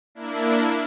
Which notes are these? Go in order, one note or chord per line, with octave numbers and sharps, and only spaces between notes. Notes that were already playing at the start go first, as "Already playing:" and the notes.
A#3 D4 E4